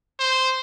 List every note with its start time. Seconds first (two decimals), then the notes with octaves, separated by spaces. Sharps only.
0.19 C5